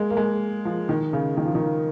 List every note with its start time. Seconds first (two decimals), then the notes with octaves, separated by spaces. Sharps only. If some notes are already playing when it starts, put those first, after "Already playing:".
Already playing: G#3 A#3
0.10 A#3
0.17 G#3
0.65 F3
0.89 D#3
1.13 C#3
1.37 D#3
1.45 F3
1.55 D#3